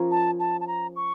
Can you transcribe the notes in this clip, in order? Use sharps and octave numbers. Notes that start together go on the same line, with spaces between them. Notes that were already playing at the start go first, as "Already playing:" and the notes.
Already playing: F3 C#4 A#4
A5
A5
A5
A#5
C#6